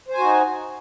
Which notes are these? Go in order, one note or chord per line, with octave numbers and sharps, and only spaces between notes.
D#4 F#4 C5 G#5